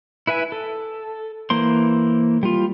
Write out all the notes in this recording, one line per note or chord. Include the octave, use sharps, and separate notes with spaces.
E4 B4 E5 G#5
A4
E3 A#3 C5 C6
G3 F4